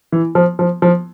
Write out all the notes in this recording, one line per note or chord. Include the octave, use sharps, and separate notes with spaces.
E3
F3
F3
F3